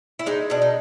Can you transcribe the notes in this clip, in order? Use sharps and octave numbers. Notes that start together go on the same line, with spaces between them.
E4
G#3 D#4
B2 D4
D#4